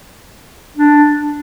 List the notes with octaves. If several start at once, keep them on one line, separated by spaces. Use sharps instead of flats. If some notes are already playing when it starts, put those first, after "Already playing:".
D4